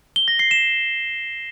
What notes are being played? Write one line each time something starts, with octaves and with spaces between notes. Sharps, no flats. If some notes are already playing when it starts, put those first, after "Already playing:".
G7
A#6
C7
E7